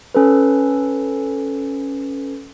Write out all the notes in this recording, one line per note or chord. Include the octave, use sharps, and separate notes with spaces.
C#4 A4 B4